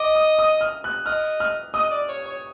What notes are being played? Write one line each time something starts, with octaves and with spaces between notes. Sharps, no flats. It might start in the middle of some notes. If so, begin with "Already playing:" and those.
Already playing: D#5 D6
D#6
D#6
F6
F#6
D#5 F6
F6
D#5 D#6
D5
C#5
C#5